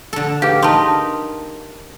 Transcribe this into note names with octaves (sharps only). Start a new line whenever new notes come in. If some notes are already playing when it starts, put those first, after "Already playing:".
D3 A4
G4 G#4 B4 F5
D#4 A#4 A5 B5 C6